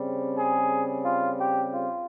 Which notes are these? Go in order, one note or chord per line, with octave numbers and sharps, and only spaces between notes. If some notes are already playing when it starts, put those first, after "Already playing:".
Already playing: C#3 G3 C4
G#4
F4
G4
F4